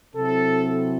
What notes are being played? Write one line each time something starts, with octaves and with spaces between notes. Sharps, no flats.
C3 F#3 C4 E4 A4